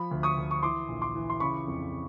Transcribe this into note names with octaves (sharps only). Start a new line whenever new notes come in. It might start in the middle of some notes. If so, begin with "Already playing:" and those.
Already playing: F3 B5
D2
C#6 D#6
D2
C#6
E3 C6 D6
A#1
C6 D6
E3
C6
C#3 B5 C#6
F2